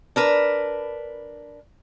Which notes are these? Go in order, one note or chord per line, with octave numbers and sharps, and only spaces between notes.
D4 A#4 B4